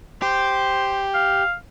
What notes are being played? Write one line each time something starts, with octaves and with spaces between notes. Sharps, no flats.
G4 C5
F5